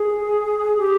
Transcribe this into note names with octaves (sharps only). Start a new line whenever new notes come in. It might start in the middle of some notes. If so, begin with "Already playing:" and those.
Already playing: G#4
G4